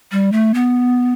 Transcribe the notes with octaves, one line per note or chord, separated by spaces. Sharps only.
G3
A3
B3